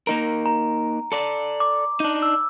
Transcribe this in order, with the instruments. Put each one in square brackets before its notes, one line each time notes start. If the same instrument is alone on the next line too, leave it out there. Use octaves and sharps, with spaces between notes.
[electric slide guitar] A#3 D#4 A#4
[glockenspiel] A#5
[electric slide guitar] A4 D5
[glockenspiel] D6
[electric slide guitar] D4 D#4
[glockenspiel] E6